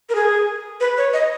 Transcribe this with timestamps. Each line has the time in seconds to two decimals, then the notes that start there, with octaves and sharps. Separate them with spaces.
0.09 A#4
0.15 G#4
0.80 B4
0.97 C#5
1.13 D#5